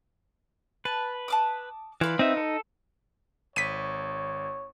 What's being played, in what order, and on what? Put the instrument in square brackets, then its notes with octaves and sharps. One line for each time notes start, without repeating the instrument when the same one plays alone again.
[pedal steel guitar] B4 [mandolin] A5
[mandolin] A5 D6 D#6
[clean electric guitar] E3 [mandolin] F4 B4 D5
[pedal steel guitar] C4 E5 [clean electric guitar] D#4
[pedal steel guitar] A4
[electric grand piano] G#1 [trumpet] C#5 [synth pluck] B6 D#7